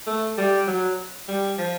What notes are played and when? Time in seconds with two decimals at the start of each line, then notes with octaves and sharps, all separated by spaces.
0.07 A3
0.38 G3
0.67 F#3
1.28 G3
1.58 F3